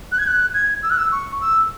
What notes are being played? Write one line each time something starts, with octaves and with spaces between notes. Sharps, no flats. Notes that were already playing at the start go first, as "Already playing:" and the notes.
F#6
G#6
F#6
G#6
E6
F#6
E6
C#6
E6